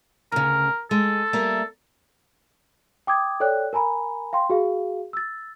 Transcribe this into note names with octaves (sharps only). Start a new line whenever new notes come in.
D2 C#3 A#4
G#3 A4
G3 A#3 E5
G5 D6 D#6 G#6
A4 C#5 D5 G5 F#6
A#4 G#5 A#5 B5
F5 G5 C6
F#4 G#4 F5
E6 A6